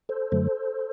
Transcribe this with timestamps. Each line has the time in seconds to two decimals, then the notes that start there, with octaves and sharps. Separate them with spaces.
0.09 A4 C5
0.32 F#2 D3 F#3 A3